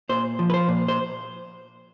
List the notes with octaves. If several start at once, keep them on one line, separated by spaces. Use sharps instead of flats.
A#2 C5
F3
B4
C5
A#2
C5